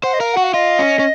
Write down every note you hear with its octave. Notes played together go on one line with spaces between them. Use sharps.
C5 F#5
D#5
A#4 F5
F#4 F#5
F5
F4 D#5
C#4
C#4